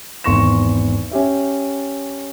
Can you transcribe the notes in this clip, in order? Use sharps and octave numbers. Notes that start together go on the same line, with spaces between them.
G#1 E2 C6 C#6 A#6 E7
C#4 G4 E5